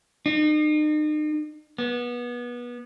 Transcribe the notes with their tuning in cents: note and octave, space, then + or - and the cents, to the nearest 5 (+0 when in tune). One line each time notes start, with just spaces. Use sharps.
D#4 -40
B3 -25